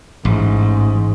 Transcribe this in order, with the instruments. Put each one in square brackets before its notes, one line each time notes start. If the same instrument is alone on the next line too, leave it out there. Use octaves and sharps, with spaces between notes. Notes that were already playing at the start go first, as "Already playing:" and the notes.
[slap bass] A1 [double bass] G#2